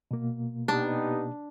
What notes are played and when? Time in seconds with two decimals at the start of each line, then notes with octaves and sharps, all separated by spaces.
0.11 B2 A#3
0.68 B3 D4 D#4 G4